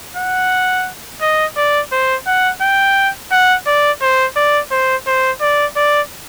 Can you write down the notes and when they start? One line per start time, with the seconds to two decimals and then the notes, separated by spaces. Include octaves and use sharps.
0.16 F#5
1.21 D#5
1.57 D5
1.92 C5
2.27 F#5
2.62 G5
3.32 F#5
3.67 D5
4.02 C5
4.36 D5
4.72 C5
5.07 C5
5.41 D5
5.76 D5